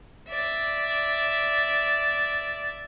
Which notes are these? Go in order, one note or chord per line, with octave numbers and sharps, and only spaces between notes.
D5 E5